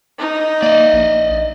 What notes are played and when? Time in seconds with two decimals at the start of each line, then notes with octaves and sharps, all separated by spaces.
0.18 D#4
0.63 A#3 D5 D#5
0.93 A#1